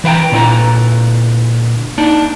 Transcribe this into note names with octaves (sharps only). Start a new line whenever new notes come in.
E3 B4 F5 G5 A#5
A#2 D3 D4 E4 B4 A#5
A#3 D4 D#4